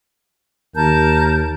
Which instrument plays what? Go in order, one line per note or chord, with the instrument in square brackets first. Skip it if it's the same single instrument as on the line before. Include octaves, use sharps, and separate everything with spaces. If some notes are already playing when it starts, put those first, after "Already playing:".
[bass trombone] D#2 [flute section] A#4 A5 G6